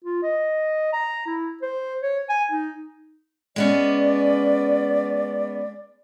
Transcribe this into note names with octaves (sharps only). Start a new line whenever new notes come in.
F4
D#5
A#5
E4
C5
C#5
G#5
D#4
G#3 B3 C#4 D5